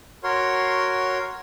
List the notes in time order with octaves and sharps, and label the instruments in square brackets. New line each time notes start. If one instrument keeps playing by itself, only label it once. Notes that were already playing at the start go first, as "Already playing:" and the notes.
[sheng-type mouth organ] F#4 A#4 C#5 C6